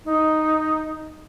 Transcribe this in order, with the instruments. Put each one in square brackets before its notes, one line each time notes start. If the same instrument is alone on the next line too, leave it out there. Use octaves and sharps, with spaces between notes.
[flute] D#4